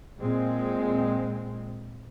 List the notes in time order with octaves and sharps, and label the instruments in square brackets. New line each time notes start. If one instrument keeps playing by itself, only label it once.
[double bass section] A#2 G#3 C4